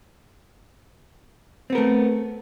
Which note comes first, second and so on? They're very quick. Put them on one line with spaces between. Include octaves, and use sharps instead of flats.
C4 B3 A#4 A3